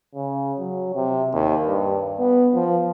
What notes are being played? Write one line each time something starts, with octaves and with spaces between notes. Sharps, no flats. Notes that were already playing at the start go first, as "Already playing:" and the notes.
C#3
F#3
C3
D#2
G2
B3
F3